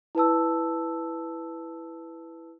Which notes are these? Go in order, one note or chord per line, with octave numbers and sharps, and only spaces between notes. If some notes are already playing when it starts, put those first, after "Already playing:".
E4 B4 A5 E6